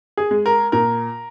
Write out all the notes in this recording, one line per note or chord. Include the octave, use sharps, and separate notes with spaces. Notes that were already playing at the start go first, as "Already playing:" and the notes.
G#4
G#3
A#4
A#2 A#4